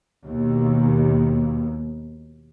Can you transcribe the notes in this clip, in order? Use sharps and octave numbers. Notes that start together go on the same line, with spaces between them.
D#2 B2